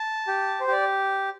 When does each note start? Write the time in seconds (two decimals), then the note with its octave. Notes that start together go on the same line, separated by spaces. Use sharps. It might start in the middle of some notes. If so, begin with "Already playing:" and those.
Already playing: A5
0.27 G4
0.60 C5
0.68 G4 D5